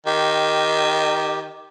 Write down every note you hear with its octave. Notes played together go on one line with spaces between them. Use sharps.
D#3 G4